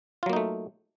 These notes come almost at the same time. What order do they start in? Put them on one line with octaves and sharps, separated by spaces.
F4 F#3 A#3 D#4 A3